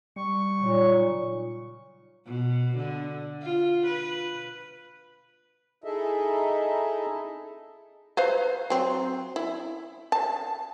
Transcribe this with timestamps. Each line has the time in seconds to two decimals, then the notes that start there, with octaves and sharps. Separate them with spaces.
0.16 G3 C#6
0.60 A#2 C#3 F#3 D#4
2.26 B2
2.78 D3
3.42 F4
3.87 B4
5.84 D#4 E4 G#4 A4 D#5 E5
8.17 B4 C5 F5
8.70 F#3 C4
9.36 E4
10.12 A5